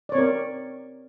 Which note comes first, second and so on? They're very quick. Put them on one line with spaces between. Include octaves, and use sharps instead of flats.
D5 C#5 C4 A#4